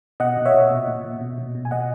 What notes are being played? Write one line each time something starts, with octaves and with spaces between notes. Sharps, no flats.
B2 D#5 F#5
B2
C#5 E5
B2
A#2
A#2
A#2
B2
B2
B2
G#5
A#2 D#5 F#5